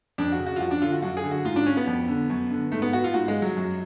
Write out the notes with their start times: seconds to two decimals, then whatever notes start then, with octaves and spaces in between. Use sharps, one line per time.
0.18 F2 D4
0.32 F#4
0.39 C#3
0.47 F#4
0.56 F4
0.60 F2 F#4
0.71 D4
0.82 D3 F4
0.92 F#4
1.02 F#2 F#4
1.17 G#4
1.24 D3
1.31 F#4
1.45 G#2 F4
1.56 D4
1.66 C#4
1.77 B3
1.87 F2
2.09 D3
2.30 F#2
2.51 D3
2.72 G#2 A3
2.82 B3
2.93 F#4
3.04 F4
3.14 G#2 F#4
3.28 G#3
3.42 F#3
3.56 F#2